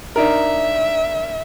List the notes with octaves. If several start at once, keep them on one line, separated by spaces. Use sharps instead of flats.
D4 D#4 A#4 E5